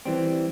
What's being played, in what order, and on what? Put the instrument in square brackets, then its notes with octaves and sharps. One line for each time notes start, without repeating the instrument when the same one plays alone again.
[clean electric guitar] E3 G3 C4